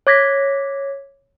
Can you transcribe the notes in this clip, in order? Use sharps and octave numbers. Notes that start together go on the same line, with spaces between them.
C#5 D6 G#6 A#6 B6